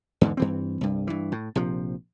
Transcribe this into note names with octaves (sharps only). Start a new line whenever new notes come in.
E2 G#2 D3
G2 E3 C4
C2 G2
G2 E3
A2
A#1 C3 F3